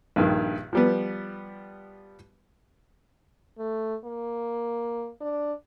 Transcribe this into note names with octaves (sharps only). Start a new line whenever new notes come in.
A#1 G2 D#3
F3 G3 B3
A3
A#3
D4